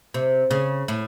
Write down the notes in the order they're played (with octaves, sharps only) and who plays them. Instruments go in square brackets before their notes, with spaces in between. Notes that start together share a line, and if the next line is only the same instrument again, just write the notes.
[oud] C3
C#3
A2